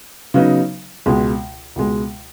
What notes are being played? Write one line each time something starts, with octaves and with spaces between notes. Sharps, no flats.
C#3 F#3 B3 D#4
C#2 B2 G#3
C#2 B2 G#3